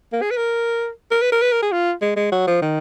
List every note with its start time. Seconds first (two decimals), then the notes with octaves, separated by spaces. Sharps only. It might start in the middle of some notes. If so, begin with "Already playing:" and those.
0.13 A#3
0.22 G#4
0.31 B4
0.37 A#4
1.11 A#4
1.21 B4
1.32 A#4
1.42 B4
1.52 A#4
1.62 G#4
1.72 F4
2.01 G#3
2.17 G#3
2.32 F#3
2.47 F3
2.62 D#3